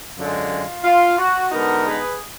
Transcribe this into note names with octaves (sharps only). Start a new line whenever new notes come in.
F#2 D3 G#3 F4
F4
F#4
D3 G#3 B3 D#4 F#4 A#4
G#4 B4